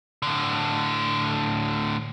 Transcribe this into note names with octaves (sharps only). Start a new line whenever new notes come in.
A2 D3